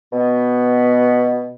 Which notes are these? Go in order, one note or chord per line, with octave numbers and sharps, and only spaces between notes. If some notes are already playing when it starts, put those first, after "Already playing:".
B2 B3